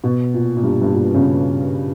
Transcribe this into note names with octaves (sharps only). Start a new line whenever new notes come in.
B2
A#2
A#2
G2
G2
A#2
C#3